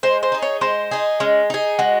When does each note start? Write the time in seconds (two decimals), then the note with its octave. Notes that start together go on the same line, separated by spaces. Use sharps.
0.03 G#3 C5
0.23 C5
0.32 D#4 G#4
0.42 C#5
0.61 G#3 C5
0.91 D#4 G#4
1.20 G#3 C#4
1.50 D#4 G#4
1.79 G#3 F#4